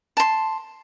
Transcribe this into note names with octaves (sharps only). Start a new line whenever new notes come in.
A5 C6